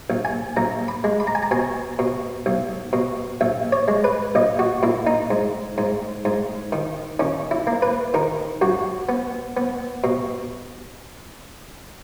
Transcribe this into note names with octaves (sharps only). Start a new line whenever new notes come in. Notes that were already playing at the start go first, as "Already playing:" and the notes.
A#1
G#5
A#1 A#5
B5
G#3
B5
A#5
G#5
A#5
B2 G#5
B2
B1
B2
A#1 E5
C#5
G#3
B4
A#1 D#5
F#4
A#2 E4
D#4
G#2
G#2
G#2
D#3
D#3 C#4
E4
A#3
B4
D#3 A#4
F#2 F#4
B3
B3
B2